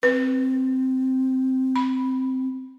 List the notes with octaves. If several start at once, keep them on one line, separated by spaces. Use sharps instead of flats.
C4 B4
B5